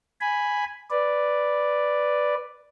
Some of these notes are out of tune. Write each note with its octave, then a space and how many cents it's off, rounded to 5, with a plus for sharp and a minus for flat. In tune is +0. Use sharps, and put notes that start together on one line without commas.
G#5 +0 B5 +0
B4 +0 D5 +0